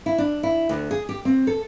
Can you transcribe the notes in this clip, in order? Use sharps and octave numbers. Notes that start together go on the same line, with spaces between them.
E4
D4
E4
D2
G#4
G4
C4
A4